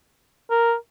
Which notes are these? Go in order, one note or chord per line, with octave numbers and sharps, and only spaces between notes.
A#4